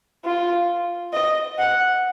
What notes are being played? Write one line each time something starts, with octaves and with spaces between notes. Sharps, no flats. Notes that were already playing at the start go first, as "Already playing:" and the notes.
F4
D#5
F#5